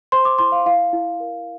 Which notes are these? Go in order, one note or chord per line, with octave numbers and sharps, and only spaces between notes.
C5 C6
D6
E4 C6
F5
E4 F5
E4
A#4